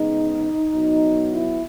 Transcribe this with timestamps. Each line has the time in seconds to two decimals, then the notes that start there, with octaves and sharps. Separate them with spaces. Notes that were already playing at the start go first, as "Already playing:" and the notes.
Already playing: C#3 G#3 B3 D#4
0.73 B2 F#3 B3
1.32 E4